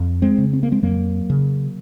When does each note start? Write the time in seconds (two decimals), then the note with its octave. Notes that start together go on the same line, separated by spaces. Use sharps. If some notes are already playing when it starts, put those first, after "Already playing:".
Already playing: F2
0.22 G#3 C4
0.38 C#3
0.53 C4
0.63 A#3
0.72 G#3 C4
0.83 F2 F#3 A#3
1.30 C#3